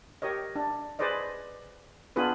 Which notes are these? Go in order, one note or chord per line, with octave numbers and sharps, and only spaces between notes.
G4 A#4 C#5 D#5
D4
G#4 B4 C5 D5 D#5
B3 D4 F4 G#4 B4